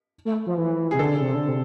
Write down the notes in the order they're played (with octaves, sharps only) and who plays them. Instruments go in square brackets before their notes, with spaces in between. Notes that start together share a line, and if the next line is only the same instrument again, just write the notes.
[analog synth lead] A3
F3
E3
[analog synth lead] C3 [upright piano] G#4
[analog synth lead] D3 [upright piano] A4
[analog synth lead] C3
D3
C3